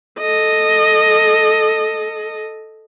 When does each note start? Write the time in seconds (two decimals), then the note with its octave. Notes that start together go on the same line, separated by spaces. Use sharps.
0.19 A4 D#5